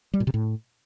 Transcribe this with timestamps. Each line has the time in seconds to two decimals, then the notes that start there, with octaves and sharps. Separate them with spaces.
0.14 G3
0.20 A#2
0.27 C3
0.34 A2